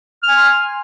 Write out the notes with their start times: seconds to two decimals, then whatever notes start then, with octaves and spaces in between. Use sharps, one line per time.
0.23 F6
0.28 G#5
0.32 C6